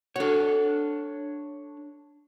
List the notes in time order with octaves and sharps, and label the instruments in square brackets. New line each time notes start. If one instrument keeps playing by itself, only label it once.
[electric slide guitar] D4 C#5 [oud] F#4 A4